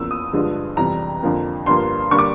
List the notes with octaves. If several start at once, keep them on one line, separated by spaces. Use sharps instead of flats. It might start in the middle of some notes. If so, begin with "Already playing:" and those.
Already playing: E2 C#3 F3 A#3 E6
D#6
G2 D3 F3 G#3
F2 C3 E3 G3 A#5
F2 D3 F3 A#3
G2 D3 F3 A#3 C6
D3 G3 A#3 C#6
D6